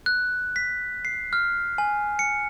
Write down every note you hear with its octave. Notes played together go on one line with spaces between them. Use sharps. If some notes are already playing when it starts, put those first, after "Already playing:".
F#6
B6
C7
F6
G#5
C#7